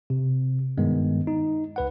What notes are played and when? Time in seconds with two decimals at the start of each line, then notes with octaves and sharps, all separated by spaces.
0.10 C3
0.78 G2 D#3 G#3 B3
1.27 D#4
1.76 C#2 B4 F#5